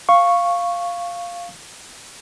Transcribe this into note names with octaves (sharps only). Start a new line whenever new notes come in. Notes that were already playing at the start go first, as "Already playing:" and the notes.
F5 C#6